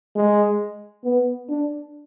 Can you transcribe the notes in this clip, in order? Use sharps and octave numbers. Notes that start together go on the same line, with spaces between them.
G#3
B3
D4